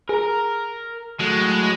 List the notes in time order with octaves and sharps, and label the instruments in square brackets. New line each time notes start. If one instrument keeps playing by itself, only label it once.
[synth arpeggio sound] G#4 [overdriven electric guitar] A#4 A#5
[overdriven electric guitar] A2 [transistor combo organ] F#3 [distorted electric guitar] G#3